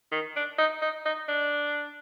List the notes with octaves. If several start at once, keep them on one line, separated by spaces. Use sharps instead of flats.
D#3
D4
D#4
D#4
D#4
D4